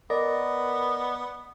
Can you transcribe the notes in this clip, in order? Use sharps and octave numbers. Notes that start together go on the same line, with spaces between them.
B3 A#4 D5 D#5